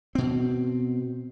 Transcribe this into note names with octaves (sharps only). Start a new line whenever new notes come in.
B2 C4